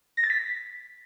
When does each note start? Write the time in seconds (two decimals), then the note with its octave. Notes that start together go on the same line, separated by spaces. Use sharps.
0.17 A#6
0.24 A6
0.30 B6